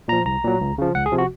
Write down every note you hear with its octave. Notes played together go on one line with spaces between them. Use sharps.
A#2 F3 A#5
C2 A#5
A#2 F#3
C#2
C#3 F3
C#2 F#5
G#4
C3 F3
F#4